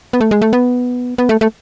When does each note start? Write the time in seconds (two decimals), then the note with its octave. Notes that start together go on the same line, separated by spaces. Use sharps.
0.13 B3
0.21 A3
0.31 G#3
0.42 A3
0.53 B3
1.18 B3
1.29 A3
1.41 A3